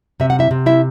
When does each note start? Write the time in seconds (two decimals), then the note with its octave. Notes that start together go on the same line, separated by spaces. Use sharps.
0.20 C3 E5
0.30 F#5
0.39 E4 E5
0.51 C3
0.66 E4 E5